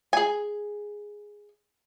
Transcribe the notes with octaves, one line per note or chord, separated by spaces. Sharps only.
G#4 G#5